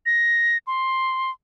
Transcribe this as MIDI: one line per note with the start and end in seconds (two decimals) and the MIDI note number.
0.06 0.58 94
0.67 1.31 84